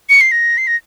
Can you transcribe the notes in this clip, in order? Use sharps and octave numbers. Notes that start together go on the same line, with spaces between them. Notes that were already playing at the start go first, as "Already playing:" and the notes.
C#7
C7
A#6
C7
A#6